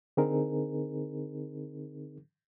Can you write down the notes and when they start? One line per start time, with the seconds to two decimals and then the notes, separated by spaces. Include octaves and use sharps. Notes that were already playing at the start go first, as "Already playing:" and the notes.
0.17 D3 C4 D#4 G#4 A#4